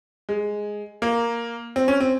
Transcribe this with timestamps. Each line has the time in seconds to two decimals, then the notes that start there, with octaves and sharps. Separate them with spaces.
0.29 G#3
1.02 A#3
1.76 C4
1.88 C#4
2.00 C4